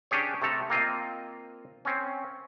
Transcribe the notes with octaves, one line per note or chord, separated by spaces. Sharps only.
C#4 D4 G4 G#4 C#5
C3 A3 A4 A#5
A#3 C4 F4 D#5
C4 C#4